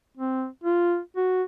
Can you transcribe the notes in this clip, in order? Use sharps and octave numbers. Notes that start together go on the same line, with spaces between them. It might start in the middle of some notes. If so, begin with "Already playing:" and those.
C4
F4
F#4